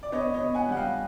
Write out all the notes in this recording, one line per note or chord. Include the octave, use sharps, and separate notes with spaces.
D5
B3 C#5 D#5
C#5 D#5
B3
F#5 G#5
G3 F#5
F5 G5